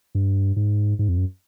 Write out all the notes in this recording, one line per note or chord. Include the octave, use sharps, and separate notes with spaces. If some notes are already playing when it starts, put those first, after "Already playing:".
G2
G#2
G#2
F2
F#2